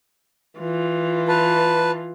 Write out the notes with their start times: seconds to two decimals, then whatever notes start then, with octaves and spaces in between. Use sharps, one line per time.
0.59 E3 F4
1.28 B4 A5